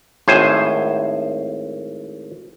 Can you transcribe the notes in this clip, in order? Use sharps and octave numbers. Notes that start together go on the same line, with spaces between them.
G#1 A2 C5 G#5